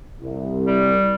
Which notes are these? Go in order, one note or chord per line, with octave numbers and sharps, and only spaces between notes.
C2
G3